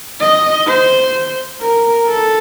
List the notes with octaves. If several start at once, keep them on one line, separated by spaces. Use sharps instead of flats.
D#5
C5
A#4
A4